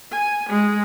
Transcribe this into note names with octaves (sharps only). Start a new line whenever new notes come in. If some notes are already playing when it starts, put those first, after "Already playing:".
G#5
G#3